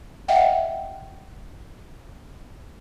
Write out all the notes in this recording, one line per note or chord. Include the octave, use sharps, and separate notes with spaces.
D#5 E5 F#5 G5